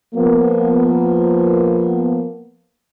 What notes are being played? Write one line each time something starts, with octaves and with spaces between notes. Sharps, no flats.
F3 A#3 B3